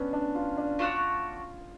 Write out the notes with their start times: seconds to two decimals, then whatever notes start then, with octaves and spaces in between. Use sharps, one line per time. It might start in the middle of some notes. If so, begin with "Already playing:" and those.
Already playing: B3 C#4 D4
0.13 D4
0.35 F4
0.57 D4
0.79 A3 D4 F4 F#4 C#5